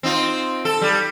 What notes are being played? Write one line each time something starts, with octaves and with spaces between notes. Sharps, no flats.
C4 D#4 F4
A4
G3